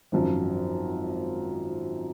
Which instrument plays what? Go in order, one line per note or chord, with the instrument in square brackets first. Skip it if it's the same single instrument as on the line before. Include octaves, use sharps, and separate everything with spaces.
[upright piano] G#1 F#2 F3